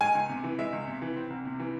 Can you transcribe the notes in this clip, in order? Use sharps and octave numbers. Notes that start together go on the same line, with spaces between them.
G#3 G#5
C#2
C3
E3
G#3 E5
C#2
C3
E3
C4
C2
C3
E3